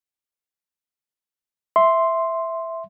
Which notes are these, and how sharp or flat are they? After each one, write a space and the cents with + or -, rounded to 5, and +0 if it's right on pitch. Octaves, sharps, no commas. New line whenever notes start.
E5 +0 C6 +0